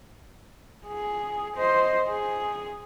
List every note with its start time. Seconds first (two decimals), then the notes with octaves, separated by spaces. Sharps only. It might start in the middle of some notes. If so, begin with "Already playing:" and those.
0.87 G#4
1.56 C5 D#5
2.09 G#4